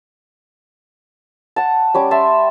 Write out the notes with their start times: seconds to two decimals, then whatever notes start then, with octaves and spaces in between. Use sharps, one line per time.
1.56 F#5 A5
1.94 G3 C#4 D6
2.11 E5 A5 C6